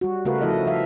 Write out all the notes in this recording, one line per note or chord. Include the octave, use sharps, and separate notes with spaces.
G3 F#4
C#3 A3 F#4 A#4 B4 F5
F3 A3 E4 A4 D#5
F3 E5 F5